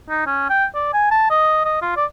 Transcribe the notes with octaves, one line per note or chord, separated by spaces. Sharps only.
D#4
C#4
G5
D5
G#5
A5
D#5
D#5
F4
D5